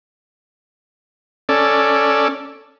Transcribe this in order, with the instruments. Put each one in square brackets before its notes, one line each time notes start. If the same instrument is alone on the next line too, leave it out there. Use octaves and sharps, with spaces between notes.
[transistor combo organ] C#4 A4 D5